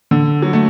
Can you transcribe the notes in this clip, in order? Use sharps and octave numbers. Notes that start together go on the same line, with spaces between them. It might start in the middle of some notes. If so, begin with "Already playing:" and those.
D3
F#3
A3